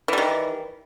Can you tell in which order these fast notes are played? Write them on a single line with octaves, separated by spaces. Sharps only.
E3 G3 D#3